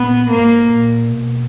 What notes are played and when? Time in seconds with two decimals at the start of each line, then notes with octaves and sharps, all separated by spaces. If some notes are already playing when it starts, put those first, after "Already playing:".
Already playing: A#2 B3
0.29 G#2 A#3
0.68 A#2
1.07 B2